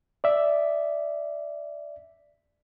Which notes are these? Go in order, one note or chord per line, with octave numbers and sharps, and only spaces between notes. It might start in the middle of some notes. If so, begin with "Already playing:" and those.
D5 E5